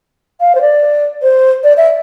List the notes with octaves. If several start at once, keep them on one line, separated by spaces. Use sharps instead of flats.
F5
C5
D5
C5
D5
E5